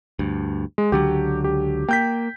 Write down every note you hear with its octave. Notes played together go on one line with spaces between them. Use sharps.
D2 G2
G#3
C#2 D3 F#3 G4
G4
A#3 G5 G6 B6